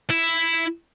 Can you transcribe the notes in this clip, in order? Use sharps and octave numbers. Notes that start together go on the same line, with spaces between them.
E4